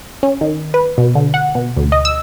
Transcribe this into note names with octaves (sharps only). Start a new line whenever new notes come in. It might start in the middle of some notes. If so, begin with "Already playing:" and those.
C#4
D#3
B4
B2
D3
F#5
B2
D2
D#5
E6